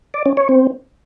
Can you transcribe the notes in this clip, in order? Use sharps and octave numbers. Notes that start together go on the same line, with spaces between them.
D5
C#4
C#5
C4